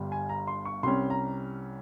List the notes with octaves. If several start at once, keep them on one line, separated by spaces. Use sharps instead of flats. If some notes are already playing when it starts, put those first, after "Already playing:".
Already playing: G1 G2 G3
G#5
A#5
C6
C#6
C2 C3 G3 C#4 C6
A#5